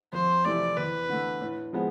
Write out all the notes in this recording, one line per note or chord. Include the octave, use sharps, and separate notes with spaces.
F2 C5
C3 E3 A3 E4 D5
E2 B4
D3 A3
A2
F3 G#3 B3